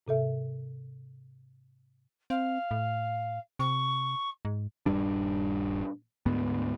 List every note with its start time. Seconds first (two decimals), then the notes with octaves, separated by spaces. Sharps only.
0.07 G#2 C3 A4 E5
2.30 C4 F5
2.71 A2
3.59 C3 C#6
4.45 G#2
4.86 D#1 G2 G3 D4
6.26 D2 G#2 B3